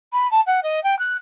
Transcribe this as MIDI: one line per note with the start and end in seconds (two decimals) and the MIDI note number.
0.13 0.30 83
0.31 0.41 81
0.47 0.60 78
0.63 0.82 75
0.84 0.98 79
0.99 1.17 90